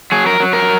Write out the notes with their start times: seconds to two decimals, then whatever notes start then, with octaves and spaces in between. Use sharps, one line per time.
0.12 F#3 G#4
0.26 A#4
0.40 F#3
0.53 A#4